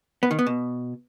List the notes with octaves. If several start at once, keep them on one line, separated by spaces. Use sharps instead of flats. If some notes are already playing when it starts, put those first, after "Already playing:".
B3
D#3
B3
B2